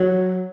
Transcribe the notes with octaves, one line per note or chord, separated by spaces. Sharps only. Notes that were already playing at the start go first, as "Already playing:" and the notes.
Already playing: F#3